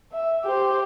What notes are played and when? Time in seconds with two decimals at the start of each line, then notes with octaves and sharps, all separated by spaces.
0.13 E5
0.44 G4 C5